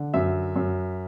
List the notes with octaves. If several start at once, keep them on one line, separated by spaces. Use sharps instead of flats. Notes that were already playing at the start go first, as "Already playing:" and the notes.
Already playing: D3
F#2 E5
F#2